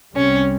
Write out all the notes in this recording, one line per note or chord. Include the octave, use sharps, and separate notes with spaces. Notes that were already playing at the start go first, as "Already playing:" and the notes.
C2 C3 G3 C4 C#4